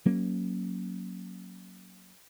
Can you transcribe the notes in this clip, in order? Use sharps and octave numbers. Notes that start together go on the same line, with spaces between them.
F#3 A#3 C#4